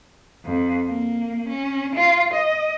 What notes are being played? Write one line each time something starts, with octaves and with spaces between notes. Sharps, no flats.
F2
A#3
C#4
F4
D#5